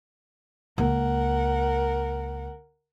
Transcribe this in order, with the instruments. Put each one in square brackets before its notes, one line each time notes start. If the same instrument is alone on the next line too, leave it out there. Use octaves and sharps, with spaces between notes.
[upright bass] C#2 A#3 [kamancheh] A#4 F#5